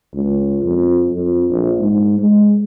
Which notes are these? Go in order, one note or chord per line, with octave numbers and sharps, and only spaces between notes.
C#2
F2
F2
A#1
G#2
G#3